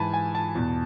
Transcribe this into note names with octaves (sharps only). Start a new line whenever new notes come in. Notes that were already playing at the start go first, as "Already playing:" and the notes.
Already playing: G#2 E3 G#5 A5 B5
G#5
A5
E2 B2